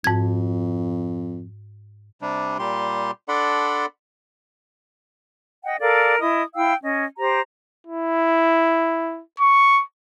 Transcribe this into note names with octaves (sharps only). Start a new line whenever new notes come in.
F2 G#2 G#6
C3 G3 D4
A#2 G3 G4 C6
D4 A4 D5 F#5 B5 C6
D#5 F#5 G5
A4 A#4 D5 F5
E4 D#5 D#6
E4 F5 G5 E6
C#4 D#5
G4 C5 A#5
E4
C#6